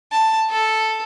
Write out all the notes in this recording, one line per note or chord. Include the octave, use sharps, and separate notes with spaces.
A5
A4